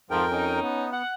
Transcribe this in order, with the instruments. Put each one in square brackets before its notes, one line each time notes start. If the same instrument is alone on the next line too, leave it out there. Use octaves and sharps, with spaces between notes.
[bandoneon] F2 A#4 G5 [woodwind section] G#2 F3
[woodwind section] C#4 D#4
[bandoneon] B3
[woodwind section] F#5